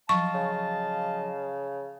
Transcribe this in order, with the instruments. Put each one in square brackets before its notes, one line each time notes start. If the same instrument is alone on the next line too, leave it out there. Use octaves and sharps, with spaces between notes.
[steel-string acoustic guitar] F3 F#3 [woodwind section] D#5 F5 A5 [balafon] C#6
[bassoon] C#3